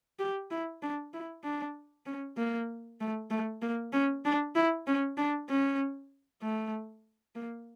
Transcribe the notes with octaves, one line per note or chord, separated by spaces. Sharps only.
G4
E4
D4
E4
D4
C#4
A#3
A3
A3
A#3
C#4
D4
E4
C#4
D4
C#4
A3
A#3